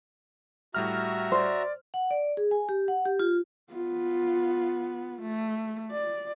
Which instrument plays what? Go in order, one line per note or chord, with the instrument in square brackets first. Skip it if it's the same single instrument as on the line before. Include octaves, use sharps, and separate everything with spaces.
[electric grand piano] A2 G3 F6 [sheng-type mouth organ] F#4 E5 A#5
[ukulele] C5 [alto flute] D5
[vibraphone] F#5
D5
G#4
G#5
G4
F#5
G4
F4
[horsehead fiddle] B3 F4
A3
D5